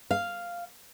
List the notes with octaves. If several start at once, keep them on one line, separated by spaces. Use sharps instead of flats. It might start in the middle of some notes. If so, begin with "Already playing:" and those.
F5